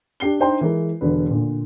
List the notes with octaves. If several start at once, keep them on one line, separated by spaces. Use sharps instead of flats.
D4 G4 C7 G7
D4 D#4 C5 G5 A#5 C6
E3 G#3 A#4
E1 D3 B4
A#2 D3